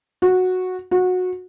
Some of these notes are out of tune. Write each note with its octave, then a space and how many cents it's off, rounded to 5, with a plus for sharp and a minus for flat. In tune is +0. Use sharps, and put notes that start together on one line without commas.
F#4 -10
F#4 -20